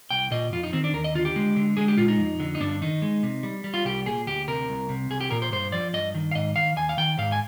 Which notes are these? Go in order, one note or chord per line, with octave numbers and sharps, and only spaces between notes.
C2 G5
A#2 D#5
F2 F4
D#4
D#3 C4
D4
D#2 A#4
D#5
D3 F4
G4
G#3
D3
G#3 G#4
G4
A#2 F4
D#4
F2
D3
D#4
G2 D4
D#3 D#4
G#3
C3
G3
G3
F4
C2 G4
A#2 G#4
D2 G4
C3 A#4
C2
C3
C2 G#4
G4
A#2 A#4
C5
G2 C5
F3 D5
G2 D#5
D#3
F5
G#2 D#5
D#3 F5
D#2 G#5
F5
D#3 G5
G#2 F5
G#5